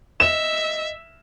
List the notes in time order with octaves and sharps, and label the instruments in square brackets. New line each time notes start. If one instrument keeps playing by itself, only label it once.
[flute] D#5 [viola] E5 [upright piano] E7